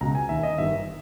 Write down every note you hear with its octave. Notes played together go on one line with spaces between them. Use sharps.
C#2 B2 A#5
G#5
D#2 D#3 E5
D#5
G1 G2 D#3 E5